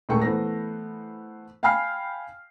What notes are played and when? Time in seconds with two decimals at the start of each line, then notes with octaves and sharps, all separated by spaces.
0.09 D#1 G#3 A3 G5 C#6
0.22 E3 A3 B3 C5 A#6
1.63 F5 G5 G#5 B5 F6 C7